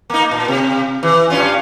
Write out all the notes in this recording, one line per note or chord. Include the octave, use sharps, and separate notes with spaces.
A#3 D#4
A#2
C3
E3
G2 C#4 F4